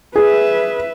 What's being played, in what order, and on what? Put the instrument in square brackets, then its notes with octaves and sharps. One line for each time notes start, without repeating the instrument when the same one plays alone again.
[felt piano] G#4 [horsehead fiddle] B4 E5